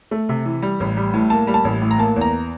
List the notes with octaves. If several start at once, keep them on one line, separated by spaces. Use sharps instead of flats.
A3
C3
E3
G3
A1
G3
A2
A#3 A5
G3
A5
A1
A2
A#5
A#3 A5
E2
A#5